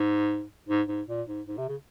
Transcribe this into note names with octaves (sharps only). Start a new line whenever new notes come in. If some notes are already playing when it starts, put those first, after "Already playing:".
Already playing: G#2
G#2
G#2
A#2
G#2
G#2
C3
C#3